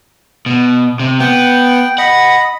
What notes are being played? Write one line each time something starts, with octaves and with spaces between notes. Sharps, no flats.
B2
C3
B3 G5
D#5 F#5 B5